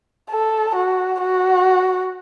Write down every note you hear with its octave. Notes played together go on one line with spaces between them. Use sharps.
A4
F#4
F#4